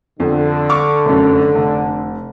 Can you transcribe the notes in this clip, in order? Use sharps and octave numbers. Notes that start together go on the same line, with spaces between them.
F2 D3
C#6 D6 F6
F1 F#2
F1